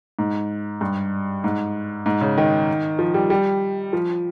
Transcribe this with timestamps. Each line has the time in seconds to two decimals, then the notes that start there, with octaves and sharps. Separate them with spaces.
0.19 G#2
0.81 G2
1.44 G#2
2.06 G#2
2.21 C#3
2.38 D#3
2.99 F3
3.14 G3
3.30 G3
3.93 F3